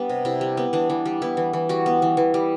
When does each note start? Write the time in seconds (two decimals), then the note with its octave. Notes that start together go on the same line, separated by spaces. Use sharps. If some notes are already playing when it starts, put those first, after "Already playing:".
Already playing: G3 B3 D4
0.09 C3
0.25 C3 E4
0.41 G3
0.57 B3
0.73 E3 D4
0.90 E3
1.05 G3
1.22 B3 E4
1.37 E3
1.53 E3
1.69 G3 F#4
1.86 B3
2.02 E3
2.17 E3
2.34 G3